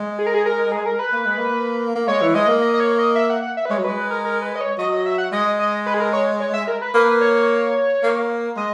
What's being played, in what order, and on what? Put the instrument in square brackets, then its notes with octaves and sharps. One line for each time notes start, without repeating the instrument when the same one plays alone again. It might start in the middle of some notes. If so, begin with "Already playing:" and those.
Already playing: [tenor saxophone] G#3
[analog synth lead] G#4
A#4
G#4
A#4
G#4
A#4
B4
[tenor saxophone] A#3
G#3
A#3
A#3
[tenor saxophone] G#3 [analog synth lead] C#5
[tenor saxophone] E3
[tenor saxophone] G#3 [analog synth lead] D#5
[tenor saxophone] A#3
[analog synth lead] D#5
D#5
C#5
D#5
E5
F#5
F#5
E5
B4
[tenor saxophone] G#3 [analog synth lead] C#5
[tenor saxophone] F#3
[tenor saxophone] G#3 [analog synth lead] B4
[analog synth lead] B4
A#4
A#4
B4
D#5
C#5
[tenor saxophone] F#3 [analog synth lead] D#5
[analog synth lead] D#5
E5
F#5
[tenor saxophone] G#3 [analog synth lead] D#5
[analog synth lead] D#5
B4
G#4
A#4
C#5
C#5
E5
A#4
B4
[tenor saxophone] A#3 [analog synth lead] B4
[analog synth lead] C#5
[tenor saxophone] A#3
[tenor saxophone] G#3 [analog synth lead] D#5